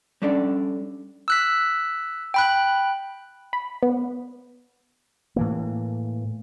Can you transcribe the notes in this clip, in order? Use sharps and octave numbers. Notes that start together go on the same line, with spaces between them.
G3 C#4 D4 A4 D5
E6 F#6 B6
G5 B5 F#6
B5
B3
A2 E3 A#3